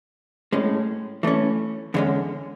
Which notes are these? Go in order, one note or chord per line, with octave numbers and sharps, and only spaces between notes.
A2 G#3 C#4
E3 A3 C#4
E2 D3 G#3 C#4